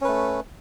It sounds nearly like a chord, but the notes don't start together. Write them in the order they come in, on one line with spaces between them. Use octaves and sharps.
C#4 B4 A3